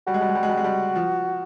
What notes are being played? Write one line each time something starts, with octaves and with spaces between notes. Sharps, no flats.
G3 F#4
G#3
G3
G#3
G3
G#3
G3
G#3
G3
F3